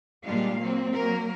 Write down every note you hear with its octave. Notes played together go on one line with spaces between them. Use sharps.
A#2 G3 G#3 D4 F5
F#3 A#3 C4
F#3 A#3 A#4